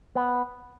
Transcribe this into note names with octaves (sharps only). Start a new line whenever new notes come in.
B3